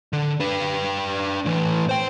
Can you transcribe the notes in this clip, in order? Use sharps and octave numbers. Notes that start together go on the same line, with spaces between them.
D3
D4 B4
A2 E3
C5 G5